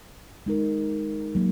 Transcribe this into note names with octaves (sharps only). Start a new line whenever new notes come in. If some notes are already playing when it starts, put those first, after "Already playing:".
G#3 D#4 A#4
F#3 A#3